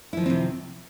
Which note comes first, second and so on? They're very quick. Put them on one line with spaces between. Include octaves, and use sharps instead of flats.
E4 F3 D#3 C4 C3